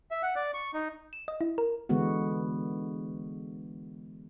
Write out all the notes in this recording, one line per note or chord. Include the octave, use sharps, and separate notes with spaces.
E5
F#5
D5
C#6
D#4
E7
D#5
E4
A#4
D3 E3 G#3 B3 F#4